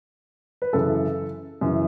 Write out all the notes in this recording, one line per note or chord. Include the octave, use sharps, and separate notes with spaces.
B4
F#2 C#3 E3 A4
F#2 C#3 E3